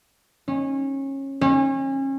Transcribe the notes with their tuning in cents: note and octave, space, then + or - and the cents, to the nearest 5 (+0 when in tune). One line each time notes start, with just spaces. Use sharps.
C#4 -25
C#4 -35